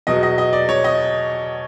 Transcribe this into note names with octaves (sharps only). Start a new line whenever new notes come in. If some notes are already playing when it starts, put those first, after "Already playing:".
E2 B2 F#3 D#5
D#5
D#5
D5
C#5
D#5